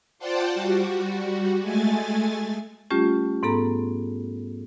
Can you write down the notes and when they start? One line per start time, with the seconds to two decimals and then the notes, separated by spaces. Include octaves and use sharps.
0.19 F4 C5 D5 F#5 G5 A5
0.53 G3 F#4
1.60 G#3 A3 G#5 A6
2.91 G3 A3 C#4 F4 G4
3.43 G#2 B3 A4 A#5